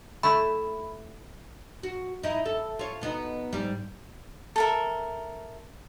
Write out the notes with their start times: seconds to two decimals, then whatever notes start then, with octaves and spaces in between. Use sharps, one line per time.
0.23 A3 E4 B5
1.83 F#4
2.23 D#4 E4
2.46 A4
2.79 F4 C#5
3.01 B2 B3 D#4
3.53 G#2 G3
4.56 A4 A#4 E5